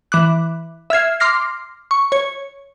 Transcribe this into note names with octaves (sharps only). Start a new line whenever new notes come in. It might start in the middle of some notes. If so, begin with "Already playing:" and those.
E3 D6 F#6
E5 F6 G#6 C7
C6 D6 F6 A#6 C7
C#6
C#5